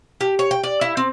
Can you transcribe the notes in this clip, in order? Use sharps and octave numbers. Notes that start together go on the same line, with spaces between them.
G4
C#5
G5
D5
E4
C4